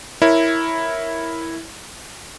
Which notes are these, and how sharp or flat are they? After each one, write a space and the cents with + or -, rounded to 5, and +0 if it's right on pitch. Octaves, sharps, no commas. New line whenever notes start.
E4 -5 A#4 +0 C#5 -5